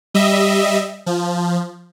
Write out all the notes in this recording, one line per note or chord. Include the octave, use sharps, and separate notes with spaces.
G3 D#5 E5
F3